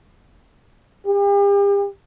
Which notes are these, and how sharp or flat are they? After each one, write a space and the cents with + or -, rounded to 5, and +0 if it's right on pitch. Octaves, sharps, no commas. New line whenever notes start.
G4 +40